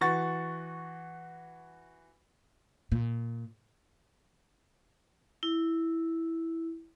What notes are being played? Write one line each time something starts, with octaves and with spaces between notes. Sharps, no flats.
E3 F#4 C#6 A6
A#2
E4